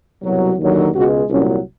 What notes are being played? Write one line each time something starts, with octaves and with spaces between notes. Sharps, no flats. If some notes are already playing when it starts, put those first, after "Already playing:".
C2 B2 F#3
D#2 D3 F#3
C#2 B2 G#3 F#4
C2 A#2 F#3 C#4